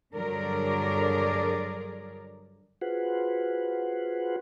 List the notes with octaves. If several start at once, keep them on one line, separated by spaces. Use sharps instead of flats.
G2 D3 F#3 G#4 A#4 D5
F4 F#4 G#4 B4 C5 F#5